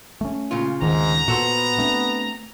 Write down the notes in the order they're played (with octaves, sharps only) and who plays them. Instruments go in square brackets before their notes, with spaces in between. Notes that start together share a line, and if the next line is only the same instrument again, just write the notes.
[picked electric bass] A3 C#4
[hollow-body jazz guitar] A#2 C#3 F4
[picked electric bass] D2 D#3 [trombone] G#2 [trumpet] A#5
[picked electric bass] A#2 [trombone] B3 [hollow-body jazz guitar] F#4 A4 C5
[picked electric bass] A3 C4 D4